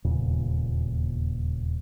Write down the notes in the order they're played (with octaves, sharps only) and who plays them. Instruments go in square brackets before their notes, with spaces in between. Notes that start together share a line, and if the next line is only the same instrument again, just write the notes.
[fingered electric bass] D#1 E2 A#2 C#3